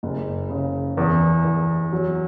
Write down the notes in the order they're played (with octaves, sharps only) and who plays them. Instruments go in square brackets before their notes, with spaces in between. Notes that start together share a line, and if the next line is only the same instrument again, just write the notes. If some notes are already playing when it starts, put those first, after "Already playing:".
[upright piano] F#1
C#3
E2
E2
F#3